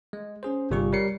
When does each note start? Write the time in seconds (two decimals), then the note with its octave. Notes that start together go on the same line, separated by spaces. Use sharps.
0.13 G#3
0.43 C#4 G#4 C5
0.71 G1 C3 G3 F4 G#4 C#6
0.93 G3 A#4 C#5 C7 C#7